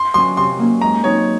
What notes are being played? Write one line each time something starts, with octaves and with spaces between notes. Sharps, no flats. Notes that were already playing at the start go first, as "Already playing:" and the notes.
Already playing: C6
F#3 C#4 C6
C3 C6
F#3 A#3 C#4
G#2 A#5
F#3 C4 D#4 C#5